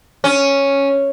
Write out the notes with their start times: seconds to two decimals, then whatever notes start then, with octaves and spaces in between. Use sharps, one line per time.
0.24 C#4